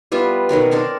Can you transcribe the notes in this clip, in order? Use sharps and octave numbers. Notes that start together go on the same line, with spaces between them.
G3 B3 F4 E5
B2 D#3 F#3 A#4
C4 D4 A4 A#4